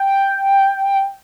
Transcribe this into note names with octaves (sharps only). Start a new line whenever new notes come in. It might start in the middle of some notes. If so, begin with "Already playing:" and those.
Already playing: G5